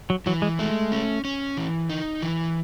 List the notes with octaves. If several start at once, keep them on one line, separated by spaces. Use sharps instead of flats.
F#3
E3 F#3
G#3
G#3 A3
C#4
C#4
E3
D#4
E3